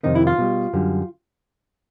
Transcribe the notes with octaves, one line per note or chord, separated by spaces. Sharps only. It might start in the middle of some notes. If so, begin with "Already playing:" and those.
F2 C3 D#3 D#4
E4
F4
B2 G3
F#2 D3 G3